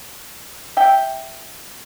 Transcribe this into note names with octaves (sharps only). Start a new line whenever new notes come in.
E5 G5